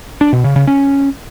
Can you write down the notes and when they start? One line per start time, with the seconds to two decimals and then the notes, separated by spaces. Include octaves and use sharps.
0.21 D4
0.33 B2
0.44 C#3
0.56 C#3
0.67 C#4